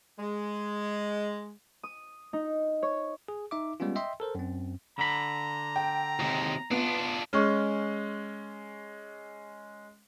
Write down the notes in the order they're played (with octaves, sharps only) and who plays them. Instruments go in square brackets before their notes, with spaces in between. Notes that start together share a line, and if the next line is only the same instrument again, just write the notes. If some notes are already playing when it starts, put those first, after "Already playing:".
[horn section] G#3
[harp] D#6
D#4
C#5
[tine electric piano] G#4
D#4 E5 D6
G3 G#3 B3 C#4 F4
D#5 E5 G5 C6
A4 A#4 C5
F#2 C4
[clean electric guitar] D3 B5 [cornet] A#5
[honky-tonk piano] G5
[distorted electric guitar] D#2 C3
[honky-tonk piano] B3 [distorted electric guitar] D4 F4
[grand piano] G#3 C#4 [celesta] G#4 C#6 F6